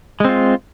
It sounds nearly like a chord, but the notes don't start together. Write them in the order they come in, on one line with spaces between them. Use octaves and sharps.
G#3 C4 F4